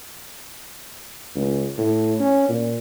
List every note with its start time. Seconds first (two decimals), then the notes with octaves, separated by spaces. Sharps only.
1.35 C#2
1.78 A2
2.20 C#4
2.49 A#2